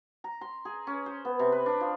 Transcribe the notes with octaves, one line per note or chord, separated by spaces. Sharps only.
A#5
C6
G#4
C#4
C5
B3
C3
B4
D4
F3